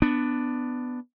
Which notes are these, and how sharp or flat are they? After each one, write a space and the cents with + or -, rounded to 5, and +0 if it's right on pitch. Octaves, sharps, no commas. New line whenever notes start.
B3 +10 D4 +10